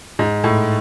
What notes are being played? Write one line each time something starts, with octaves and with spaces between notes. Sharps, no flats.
G#2
A2